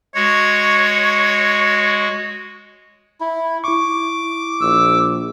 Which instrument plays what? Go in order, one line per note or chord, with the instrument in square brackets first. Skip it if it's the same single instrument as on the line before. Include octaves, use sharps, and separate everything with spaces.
[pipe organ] G#3 F#4 [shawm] C#5
[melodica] E4
[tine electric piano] E4 C#6 [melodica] D6
[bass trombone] A#1 [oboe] E6